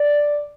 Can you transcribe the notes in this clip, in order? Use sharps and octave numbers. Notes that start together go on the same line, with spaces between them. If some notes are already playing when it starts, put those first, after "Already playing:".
Already playing: D5